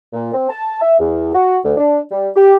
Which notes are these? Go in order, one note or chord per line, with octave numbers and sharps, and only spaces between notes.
A#2
C4
A5
E5
E2
F#4
D2
D4
G3
G4